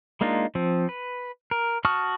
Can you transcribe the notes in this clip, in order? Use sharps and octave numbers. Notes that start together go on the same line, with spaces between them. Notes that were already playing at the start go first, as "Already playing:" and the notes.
G#3 A#3 D4 D#4 F4
F3 C4
B4
A#4
F#4 A5 C#6 D#6 F6